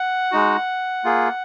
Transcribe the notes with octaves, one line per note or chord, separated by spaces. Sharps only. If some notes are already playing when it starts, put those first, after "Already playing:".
Already playing: F#5
G#3 D#4 F#4
A#3 F4 G#4